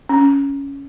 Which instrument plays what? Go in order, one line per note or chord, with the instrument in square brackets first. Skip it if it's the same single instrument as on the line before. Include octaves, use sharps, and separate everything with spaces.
[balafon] C#4